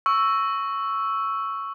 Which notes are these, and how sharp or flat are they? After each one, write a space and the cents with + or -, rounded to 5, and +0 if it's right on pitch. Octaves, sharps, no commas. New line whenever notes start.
C#6 +0 E6 +0